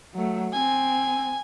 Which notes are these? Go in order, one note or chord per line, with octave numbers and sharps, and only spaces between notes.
F#3 A3
C4 G#5